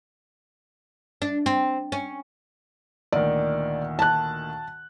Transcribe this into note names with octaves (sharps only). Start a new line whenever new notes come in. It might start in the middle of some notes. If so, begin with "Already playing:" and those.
D4
C4
C#4
D2 A#2 D#3 D5
A5 F#6